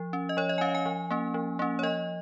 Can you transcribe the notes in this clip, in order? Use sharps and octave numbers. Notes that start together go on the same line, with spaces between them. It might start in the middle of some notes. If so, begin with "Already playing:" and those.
Already playing: F3
C#4
D#5
F3 C#5
D#5
G#5
C#4 F5
G#5
F3
A#3 C#4
F3
A#3 C#4
C#5
F3 D#5